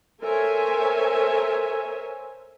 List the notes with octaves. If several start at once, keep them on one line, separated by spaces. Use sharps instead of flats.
A4 A#4 C5 C#5 E5 G#5